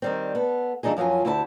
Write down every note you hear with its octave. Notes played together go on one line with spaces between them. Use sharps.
D#3 G3 C4
B3 A4
A#2 E3 G3 D4 D#4 G#4
F#2 F3 F#3 F4 G#5
D2 E4 F#4 G4 G#5 A5